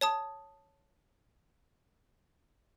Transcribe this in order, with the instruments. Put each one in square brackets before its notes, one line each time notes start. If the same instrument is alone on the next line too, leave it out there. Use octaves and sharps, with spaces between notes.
[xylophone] C#5 A5 D#6